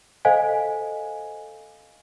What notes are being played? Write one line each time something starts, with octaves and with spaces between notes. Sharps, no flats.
A4 C5 D#5 F5 G#5